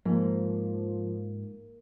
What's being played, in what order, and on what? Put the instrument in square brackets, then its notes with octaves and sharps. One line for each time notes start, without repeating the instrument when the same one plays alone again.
[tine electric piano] G#2 [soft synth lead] F3 [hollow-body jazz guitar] A#3